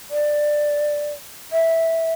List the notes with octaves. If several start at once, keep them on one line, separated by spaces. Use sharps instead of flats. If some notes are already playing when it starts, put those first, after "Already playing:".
D5
E5